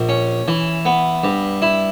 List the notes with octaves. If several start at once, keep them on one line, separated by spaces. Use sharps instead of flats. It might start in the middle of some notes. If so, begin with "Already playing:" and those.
Already playing: A#1
C#4
E3
B3
G2
E4